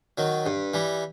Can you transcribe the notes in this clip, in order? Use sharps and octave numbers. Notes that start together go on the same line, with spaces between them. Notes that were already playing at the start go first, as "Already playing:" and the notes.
D#3 F#3
G2
E3 G3